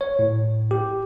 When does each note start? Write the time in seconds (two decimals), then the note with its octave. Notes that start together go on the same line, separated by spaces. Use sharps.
0.01 C#5
0.19 A2
0.71 G4